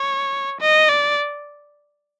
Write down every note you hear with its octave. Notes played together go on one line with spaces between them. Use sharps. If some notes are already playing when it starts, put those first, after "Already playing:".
Already playing: C#5
D#5
D5